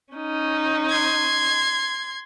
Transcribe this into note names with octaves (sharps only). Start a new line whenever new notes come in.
C#4 D#4
C6 G#6